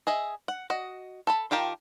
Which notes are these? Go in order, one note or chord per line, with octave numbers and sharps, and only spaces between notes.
G#4 D#5 E5
F#5
F#4 D#5
A4 A5 B5
D#3 F4 G4 A#4 A5